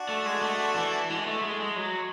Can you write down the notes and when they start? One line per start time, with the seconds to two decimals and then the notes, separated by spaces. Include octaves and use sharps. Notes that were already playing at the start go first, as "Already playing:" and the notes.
Already playing: D4 F#4
0.09 A3
0.26 G#3
0.43 A3
0.76 E3
1.10 G#3
1.26 A3
1.43 G#3
1.61 G#3
1.76 F#3